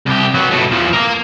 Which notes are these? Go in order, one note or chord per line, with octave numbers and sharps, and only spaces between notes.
C2 G4
F#3 B3
B2 A3
E2 F3
A#3 A#4